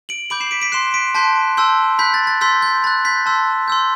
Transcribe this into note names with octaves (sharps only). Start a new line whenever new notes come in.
D7 F#7
B5 D6 G6 D7 F#7
C7 E7
B6 D7
B6 D7
C6 F#6 C7 E7
B6 D7
A5 C6 F#6 G6 B6
A5 C6 E6 G6
B5 F#6 G6 B6
A6
A6
C6 E6 G6 B6
G6
B5 F#6 A6
G6 B6
A5 C6 E6 G6
C6 E6 G6